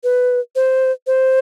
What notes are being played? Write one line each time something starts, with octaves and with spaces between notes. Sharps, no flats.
B4
C5
C5